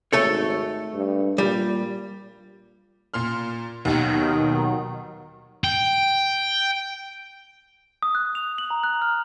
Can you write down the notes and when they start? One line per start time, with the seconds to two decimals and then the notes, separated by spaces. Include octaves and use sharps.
0.13 G#1 A3 A4 C#5
0.94 G2
1.38 A#2 G3
3.14 A#2 C6 F6
3.85 D#2 B2 D#3 F#3
5.64 G5
8.03 D#6
8.15 F#6
8.35 F7
8.58 F#7
8.70 A#5
8.84 F#6
9.02 F6